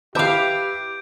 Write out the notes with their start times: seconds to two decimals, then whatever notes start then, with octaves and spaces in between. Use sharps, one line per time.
0.15 E4 G4 B4 E5 F5 D6 G6 D7